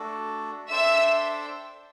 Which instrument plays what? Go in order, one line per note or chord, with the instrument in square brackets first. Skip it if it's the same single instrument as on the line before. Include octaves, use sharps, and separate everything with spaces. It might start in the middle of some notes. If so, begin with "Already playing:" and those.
Already playing: [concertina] A3 D4 F#4 A4
[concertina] D4 A4 C5 G5 [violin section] E5 E6